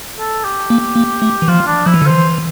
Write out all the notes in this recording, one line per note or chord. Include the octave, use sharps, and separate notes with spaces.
A4
G4
A#3
A#3
A3
E3
F3 F4
D4
F3 E4
E3
D3
E3 C5